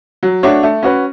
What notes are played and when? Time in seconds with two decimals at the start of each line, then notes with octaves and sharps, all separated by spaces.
0.23 F#3
0.43 A3 D4 F#4 C#5
0.63 A3
0.83 C#4 F#4 B4